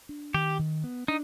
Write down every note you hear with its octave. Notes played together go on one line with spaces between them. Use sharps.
D4
D#3 G4
D#3
B3
D4 D#4